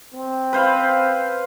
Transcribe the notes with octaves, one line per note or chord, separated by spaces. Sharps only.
C4
B4 C5 F5